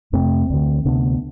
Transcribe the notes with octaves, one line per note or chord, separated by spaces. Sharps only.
F2 C3 A3 C4
D2 D3
D2 C3 B3 D4